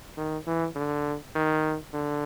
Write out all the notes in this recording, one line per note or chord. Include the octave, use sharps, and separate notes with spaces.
D#3
E3
D3
D#3
D3